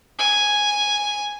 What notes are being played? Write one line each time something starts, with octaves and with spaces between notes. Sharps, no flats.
G#5